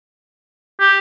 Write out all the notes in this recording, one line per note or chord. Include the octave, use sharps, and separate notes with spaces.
G4